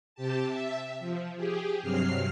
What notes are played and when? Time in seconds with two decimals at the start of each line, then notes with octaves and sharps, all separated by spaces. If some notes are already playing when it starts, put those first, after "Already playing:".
0.15 C3 G4 A5
0.49 E5
0.99 F3
1.36 G4 G#4
1.82 G2 C3 F#3 F6 C7